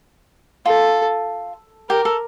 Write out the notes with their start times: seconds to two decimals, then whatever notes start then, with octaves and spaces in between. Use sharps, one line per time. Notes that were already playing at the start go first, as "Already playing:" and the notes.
0.65 F4 A4
1.89 G4 A#4
2.05 A4